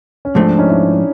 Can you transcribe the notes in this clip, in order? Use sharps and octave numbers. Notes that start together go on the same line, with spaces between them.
C#4
G#2 F3 A3 C4 D4
D4
C#4 D#4
D4 E4